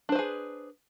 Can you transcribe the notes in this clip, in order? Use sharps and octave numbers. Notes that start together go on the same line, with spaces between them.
D4 G#4 B4 C5